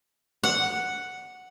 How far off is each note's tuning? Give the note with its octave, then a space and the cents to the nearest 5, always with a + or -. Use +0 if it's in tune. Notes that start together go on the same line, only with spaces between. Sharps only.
F#5 +0